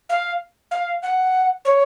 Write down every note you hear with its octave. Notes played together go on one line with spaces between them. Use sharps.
F5
F5
F#5
C#5